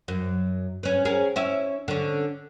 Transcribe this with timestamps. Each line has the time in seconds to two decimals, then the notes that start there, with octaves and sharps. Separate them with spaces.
0.08 F#2
0.83 C#4 B4
1.05 C#4 G#4 A#4
1.36 C#4 E4 E5
1.88 D3 C#4